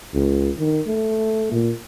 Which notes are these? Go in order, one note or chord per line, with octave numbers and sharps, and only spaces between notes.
C#2
D#3
A3
A#2